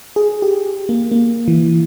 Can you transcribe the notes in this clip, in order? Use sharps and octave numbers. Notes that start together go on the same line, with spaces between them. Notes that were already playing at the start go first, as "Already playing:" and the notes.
G#4
G4
A#3
A#3
E3